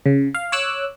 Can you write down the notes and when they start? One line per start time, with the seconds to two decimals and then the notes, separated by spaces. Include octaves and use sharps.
0.06 C#3
0.35 F5
0.52 C#5 D6 E6 F#6